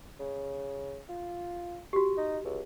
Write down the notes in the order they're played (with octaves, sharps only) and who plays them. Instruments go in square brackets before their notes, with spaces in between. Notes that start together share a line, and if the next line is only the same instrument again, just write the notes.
[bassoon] C#3
F4
[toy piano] F#4 G4
[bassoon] D#4
C#2